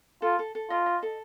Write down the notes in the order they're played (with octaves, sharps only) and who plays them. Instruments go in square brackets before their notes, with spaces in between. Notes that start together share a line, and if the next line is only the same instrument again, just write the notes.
[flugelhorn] F4 [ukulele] A4
[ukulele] A4
A4
[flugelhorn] F4 [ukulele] D#5
[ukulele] D#5
A4